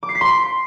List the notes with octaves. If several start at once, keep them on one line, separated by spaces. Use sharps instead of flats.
D6
C7
B6
C6